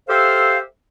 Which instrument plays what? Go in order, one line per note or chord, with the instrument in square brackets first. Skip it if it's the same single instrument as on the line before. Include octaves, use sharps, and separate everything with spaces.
[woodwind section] G4 A4 C5 E5 F5